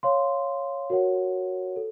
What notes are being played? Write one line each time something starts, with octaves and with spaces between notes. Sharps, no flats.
C#5 F5 C6
F#4 A#4 C#5 F#5
A4